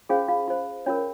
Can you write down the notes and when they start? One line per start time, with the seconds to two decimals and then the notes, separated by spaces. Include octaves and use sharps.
0.09 C#4 F4 G#4 C5 F5
0.28 F4 F5
0.48 F4 C5
0.86 C#4 F4 A#4 C#5